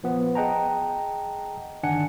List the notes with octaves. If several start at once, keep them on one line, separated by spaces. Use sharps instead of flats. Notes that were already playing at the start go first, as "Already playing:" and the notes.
A#1 F3 B3
G#4 D#5 F#5 G5 A5 A#5
G1 D#3 D4 F#5 G#5 C#7